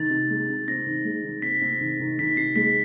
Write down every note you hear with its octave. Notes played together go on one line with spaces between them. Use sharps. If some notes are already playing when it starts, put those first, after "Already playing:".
Already playing: D#3 A6
C3
G#3
C3
C4 A#6
D#3
G#3
D#3
C4 B6
C4
D#3
D#3
D#3 B6
C3 C7
G#3 B6